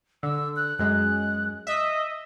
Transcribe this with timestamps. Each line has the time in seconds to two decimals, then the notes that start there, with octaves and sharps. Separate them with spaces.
0.23 D3 E6
0.56 F#6
0.79 F#2 G#3 F#6
1.67 D#5 E5